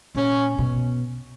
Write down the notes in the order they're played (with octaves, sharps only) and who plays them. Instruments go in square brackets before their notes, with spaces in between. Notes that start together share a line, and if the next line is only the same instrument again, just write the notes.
[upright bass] A#2 [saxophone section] C#4
[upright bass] B2